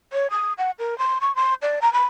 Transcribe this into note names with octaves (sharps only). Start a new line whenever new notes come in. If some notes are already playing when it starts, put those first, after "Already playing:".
C#5
D#6
F#5
A#4
C6
C#6
C6
D5
A#5
B5